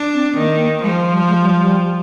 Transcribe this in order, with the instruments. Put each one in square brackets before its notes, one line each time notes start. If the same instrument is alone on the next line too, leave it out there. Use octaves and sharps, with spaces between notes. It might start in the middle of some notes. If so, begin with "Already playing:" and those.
Already playing: [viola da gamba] D4
[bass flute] C4
[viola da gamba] D#3 [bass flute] A#3
[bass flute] A#3
[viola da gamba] F3 [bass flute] G#3
[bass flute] G3
G#3
G3
G3